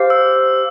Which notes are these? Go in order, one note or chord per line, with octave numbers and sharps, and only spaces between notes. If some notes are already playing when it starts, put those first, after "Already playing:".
Already playing: G4 C5 F5
E6